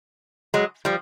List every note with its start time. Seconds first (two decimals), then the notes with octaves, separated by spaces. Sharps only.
0.54 F#3 G#3
0.85 F3 G3